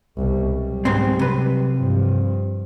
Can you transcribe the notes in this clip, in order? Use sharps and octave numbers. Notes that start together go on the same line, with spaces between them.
C2 B2
F#3 G3
G#2 B2 C4
C3 B4
G2 F3